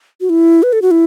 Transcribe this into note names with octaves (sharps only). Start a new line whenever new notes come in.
F#4
E4
B4
A4
F#4
E4